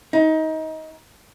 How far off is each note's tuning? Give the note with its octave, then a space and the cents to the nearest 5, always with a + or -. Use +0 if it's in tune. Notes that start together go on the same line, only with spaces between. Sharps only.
D#4 +25